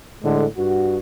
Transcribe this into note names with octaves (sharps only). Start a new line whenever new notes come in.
A2 D3 G#3
G2 F#4